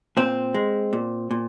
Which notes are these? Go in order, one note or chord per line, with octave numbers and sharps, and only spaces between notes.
A#2 C4
G#3
A#2
A#2